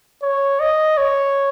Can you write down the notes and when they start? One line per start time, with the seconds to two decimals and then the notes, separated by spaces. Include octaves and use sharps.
0.23 C#5
0.60 D#5
0.98 C#5